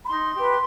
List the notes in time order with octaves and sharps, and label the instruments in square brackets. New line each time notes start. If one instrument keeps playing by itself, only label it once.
[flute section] B5
D#4 C6
G4 B4